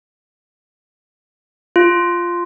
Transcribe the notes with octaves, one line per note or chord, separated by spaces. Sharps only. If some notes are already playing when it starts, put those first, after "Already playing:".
F4